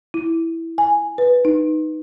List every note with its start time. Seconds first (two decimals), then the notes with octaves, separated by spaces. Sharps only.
0.14 E4
0.78 G#5
1.18 B4
1.45 D#4